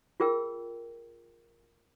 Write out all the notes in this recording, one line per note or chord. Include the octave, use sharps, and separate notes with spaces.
F4 G#4 A#4 G5 E6